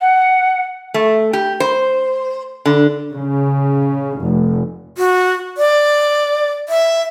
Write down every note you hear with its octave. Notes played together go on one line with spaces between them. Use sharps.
F#5
A3
G4
C5
D3
C#3
F1
F#4
D5
E5